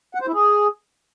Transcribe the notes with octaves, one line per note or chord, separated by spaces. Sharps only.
F#5
C5
E4
G#4